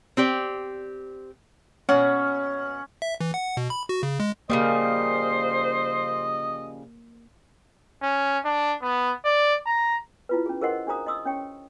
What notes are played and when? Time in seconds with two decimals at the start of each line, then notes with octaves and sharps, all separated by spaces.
0.17 C4 G4 D5
1.89 B2 C#4 F#5
3.02 E5
3.21 E3
3.34 F#5
3.57 B2
3.70 B5
3.89 F#4
4.03 C#3
4.20 G#3
4.50 C#3 F3 G3 A#3 C5 D#5
8.02 C#4
8.45 D4
8.82 B3
9.25 D5
9.66 A#5
10.29 E4 F4 B4
10.46 C#4 G#4
10.62 G#4 A#4 C5 D#5 F#5 C6
10.87 D4 F#4 G#4 C5 A#5 D#6
11.07 D#5 C6 D#6 E6
11.25 C#4 C#5 G5 C#6